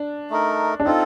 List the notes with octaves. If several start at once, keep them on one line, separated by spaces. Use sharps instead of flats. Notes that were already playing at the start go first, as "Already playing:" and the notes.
Already playing: D4
A3 D#4 A#4
D4
C4 D#4 F4 A4